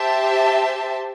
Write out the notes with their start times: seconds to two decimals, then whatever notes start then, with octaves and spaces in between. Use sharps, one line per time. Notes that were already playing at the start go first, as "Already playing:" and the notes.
Already playing: G4 C5 E5 A5